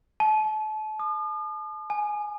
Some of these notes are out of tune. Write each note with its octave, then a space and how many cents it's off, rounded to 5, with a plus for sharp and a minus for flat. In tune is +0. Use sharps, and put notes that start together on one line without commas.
A5 -35
D#6 -45
G#5 +10